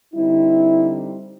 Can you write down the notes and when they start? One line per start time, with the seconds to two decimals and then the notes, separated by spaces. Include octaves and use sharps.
0.14 D3 G3 C4 D#4 E4